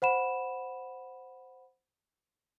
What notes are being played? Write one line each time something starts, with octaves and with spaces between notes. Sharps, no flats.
C5 F#5 B5 E7